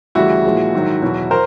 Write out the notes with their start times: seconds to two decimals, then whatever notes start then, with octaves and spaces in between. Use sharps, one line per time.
0.15 D2 C#3 E3 G3 E4 F#4
0.44 A#2 F3 G#3
0.73 G#2 D#3 F#3
1.02 E2 B2 F#3
1.31 A#4 C5